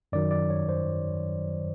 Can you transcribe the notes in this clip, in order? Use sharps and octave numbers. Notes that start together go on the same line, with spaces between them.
F#2 D#3 F#3 D5
D5
C#5
C5